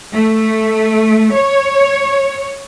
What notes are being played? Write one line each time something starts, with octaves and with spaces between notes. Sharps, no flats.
A3
C#5